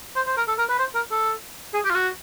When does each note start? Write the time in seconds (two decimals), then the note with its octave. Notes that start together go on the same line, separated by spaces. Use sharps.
0.16 C5
0.27 C5
0.37 A#4
0.48 A4
0.58 A#4
0.69 B4
0.79 C5
0.95 A#4
1.11 A4
1.74 G#4
1.85 G4
1.90 F4
1.95 F#4